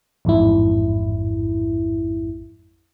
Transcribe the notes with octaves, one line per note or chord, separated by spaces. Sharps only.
A1 F2 G#2 E4